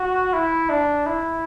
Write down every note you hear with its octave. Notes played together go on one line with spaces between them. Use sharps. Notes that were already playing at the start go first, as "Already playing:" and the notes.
Already playing: F#4
E4
D4
E4